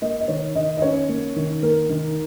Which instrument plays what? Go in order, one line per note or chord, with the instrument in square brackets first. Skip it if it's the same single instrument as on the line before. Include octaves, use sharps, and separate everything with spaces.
[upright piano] A#3 D#5
D#5
D#3 C#5
D#3 D#5
D#5
C#4 C#5
A#3
D#3
A#3 A#4
D#3